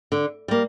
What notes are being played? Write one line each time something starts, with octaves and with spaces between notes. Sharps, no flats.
D3
G3 A#3